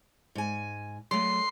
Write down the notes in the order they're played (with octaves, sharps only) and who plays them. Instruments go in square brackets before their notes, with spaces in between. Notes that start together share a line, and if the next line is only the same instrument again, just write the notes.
[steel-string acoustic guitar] G#2 G#5
[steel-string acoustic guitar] F#3 A3 [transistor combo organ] C6